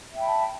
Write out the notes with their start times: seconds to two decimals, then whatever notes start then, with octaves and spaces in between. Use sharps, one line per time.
0.12 E5
0.17 G5
0.21 B5
0.25 A5